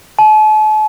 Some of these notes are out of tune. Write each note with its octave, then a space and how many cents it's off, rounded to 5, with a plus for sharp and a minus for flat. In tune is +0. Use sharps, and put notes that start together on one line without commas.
A5 -40